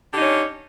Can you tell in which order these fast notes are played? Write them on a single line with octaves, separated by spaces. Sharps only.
D3 G4 D#4 C#4